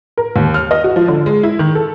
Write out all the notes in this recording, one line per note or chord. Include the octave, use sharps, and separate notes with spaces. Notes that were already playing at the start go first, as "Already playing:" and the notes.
A#4
D#2
F6
D#5
F#4
F3
D3
G#3
E4
D#3
A4